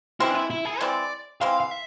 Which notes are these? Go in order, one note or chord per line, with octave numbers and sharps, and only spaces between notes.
E3 G#3 C4 E4
D4
E4
E4
G#4
E3 G#3 C4 D5
E3 G#3 C4 F5
F5
E5